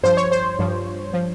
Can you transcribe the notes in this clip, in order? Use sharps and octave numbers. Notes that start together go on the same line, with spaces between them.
G2 F3 C5
C#5
C5
G2 F3
F3